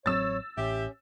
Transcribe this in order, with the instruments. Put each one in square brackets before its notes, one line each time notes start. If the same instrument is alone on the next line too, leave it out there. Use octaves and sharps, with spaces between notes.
[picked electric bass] A1 F#3 C4 [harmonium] C#5 [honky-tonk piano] E6 A6
[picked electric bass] A1 [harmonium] C#4 [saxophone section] G4 E5